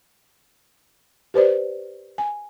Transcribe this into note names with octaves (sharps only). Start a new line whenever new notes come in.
G4 B4 C5 D5
G#5